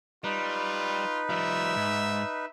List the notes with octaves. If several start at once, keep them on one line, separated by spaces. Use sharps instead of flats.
G3 D#4 F4 B4
F3 G3 E5
G#2